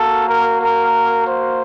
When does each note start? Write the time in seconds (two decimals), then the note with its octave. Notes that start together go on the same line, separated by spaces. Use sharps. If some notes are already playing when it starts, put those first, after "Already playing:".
Already playing: A#3 F#4 A4
0.27 A#4
0.61 A#4
1.26 C5